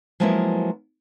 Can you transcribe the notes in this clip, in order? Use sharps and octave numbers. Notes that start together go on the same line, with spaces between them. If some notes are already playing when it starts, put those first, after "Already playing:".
F3 F#3 G#3 A#3 B3 E4